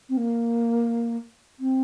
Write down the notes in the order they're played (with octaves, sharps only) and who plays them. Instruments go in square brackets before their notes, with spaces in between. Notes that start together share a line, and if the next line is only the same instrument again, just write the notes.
[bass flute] C4
A#3
C4